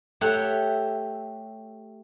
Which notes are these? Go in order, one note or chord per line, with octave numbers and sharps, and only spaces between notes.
A3 G4 A4 C#5 E5 F#5